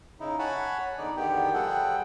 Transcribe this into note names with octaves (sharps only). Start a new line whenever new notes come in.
C#3 D#4 E4
C#5 F#5 G#5 A5 B5
E2 D3 D#4 D5
E2 D3 D#3 B3 G4 G5
F3 G3 G#4 A4 F#5 G5